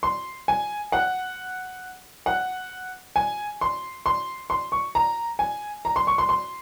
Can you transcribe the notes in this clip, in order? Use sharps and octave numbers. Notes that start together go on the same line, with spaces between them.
C6
G#5
F#5
F#5
G#5
C6
C6
C6
C#6
A#5
G#5
A#5
C6
C#6
C6
C6